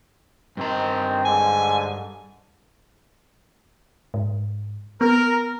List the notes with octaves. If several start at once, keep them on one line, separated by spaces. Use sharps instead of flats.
G2 D#3 C4 A#5
G#2 D3 G#5
G#2
B3 A#4